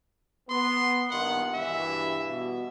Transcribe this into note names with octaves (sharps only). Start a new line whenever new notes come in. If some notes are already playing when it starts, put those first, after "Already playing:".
B3 C6
G2 A#2 D#3 F#5
G2 B2 E3 E5
B2